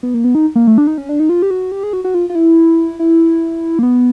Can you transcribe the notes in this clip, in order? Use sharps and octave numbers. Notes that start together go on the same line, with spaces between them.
B3
A#3
B3
D#4
A#3
A3
D4
D#4
C#4
D4
D#4
F4
G4
F#4
G4
G#4
F#4
F#4
F4
F4
E4
E4
A#3
B3